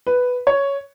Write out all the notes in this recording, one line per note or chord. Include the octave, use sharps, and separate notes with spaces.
B4
C#5